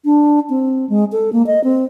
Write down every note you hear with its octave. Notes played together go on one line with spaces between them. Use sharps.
D4
C4
G#3
A4
A#3
D#5
C4